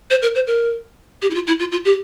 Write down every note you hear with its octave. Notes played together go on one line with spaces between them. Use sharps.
C5
A#4
C5
A#4
G4
E4
F4
E4
F4
F4
G4